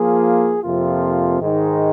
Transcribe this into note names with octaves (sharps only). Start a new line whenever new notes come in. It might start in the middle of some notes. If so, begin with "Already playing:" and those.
Already playing: F3 A#3 F4 G#4
F2 C3 F3 A#3 F4
G#2 D#3 G#3 D#4